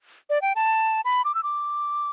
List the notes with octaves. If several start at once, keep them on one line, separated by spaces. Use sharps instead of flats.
D5
G5
A5
B5
D6
E6
D6